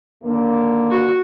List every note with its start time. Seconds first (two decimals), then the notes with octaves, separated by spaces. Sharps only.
0.23 D#2 D3 A#3
0.91 F#4